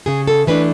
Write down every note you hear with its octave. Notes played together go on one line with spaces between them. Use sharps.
C#3 G#4
A4
E3 A3 D4 B4